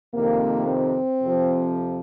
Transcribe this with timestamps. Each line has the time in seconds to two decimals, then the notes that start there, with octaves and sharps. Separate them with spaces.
0.13 F2 C3 D#3 A#3
0.68 C4
1.21 F2 C3 F3